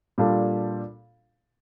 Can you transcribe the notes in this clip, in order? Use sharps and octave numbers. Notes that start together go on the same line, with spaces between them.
A#2 G3 D4 F4 A4